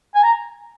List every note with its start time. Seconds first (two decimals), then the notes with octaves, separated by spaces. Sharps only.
0.15 G#5
0.23 A#5